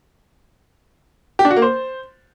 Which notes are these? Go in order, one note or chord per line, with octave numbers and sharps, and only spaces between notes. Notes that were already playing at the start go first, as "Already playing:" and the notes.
G4
D4
F#4
A#3
C5